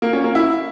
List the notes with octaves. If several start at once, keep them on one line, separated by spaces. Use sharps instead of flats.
A#3
C#4
A#3
E4